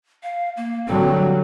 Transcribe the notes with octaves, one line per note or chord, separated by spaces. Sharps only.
F5
A#3
D3 F#3 G3 C4